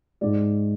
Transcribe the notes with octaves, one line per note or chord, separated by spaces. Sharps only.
G#2 G#3 D5